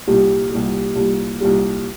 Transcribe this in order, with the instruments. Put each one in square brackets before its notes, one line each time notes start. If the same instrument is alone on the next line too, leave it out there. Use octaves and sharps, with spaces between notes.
[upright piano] C2 A#2 G3
C2 A#2 G3
C2 A#2 G3
C2 A#2 G3